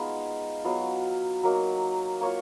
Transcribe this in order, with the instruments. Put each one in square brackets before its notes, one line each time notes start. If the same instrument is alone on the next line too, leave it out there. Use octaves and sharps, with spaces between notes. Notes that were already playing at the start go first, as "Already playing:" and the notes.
Already playing: [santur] G#3 B3 D#4 F4 F5
F#3 B3 F4 F5
F#3 A#3 D#4
A#3 F4 C#5